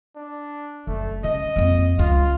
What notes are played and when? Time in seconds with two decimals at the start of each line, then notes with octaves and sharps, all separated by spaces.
0.15 D4
0.87 F#1 A3
1.24 C#3 D#5
1.56 F2 A#3
1.99 C#2 F4